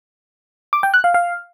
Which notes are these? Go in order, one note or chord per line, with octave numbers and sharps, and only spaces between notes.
D6
G5
F#6
F5
F5